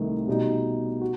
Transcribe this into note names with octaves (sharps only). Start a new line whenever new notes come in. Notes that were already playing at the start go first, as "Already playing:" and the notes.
Already playing: C2 C3 D#3 A3 D#4
B2 G3 D#4
F#4